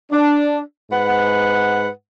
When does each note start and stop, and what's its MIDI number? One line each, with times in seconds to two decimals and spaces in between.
0.12 0.59 62
0.91 1.88 44
0.91 1.88 71
0.91 1.88 78